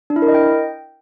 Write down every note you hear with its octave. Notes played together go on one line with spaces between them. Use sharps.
D4
E4
A#4
D#5
G5